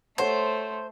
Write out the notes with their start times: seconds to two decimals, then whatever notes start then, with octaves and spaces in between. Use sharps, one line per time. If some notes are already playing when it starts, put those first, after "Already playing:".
0.18 A3 A4 C5 C#5 F#5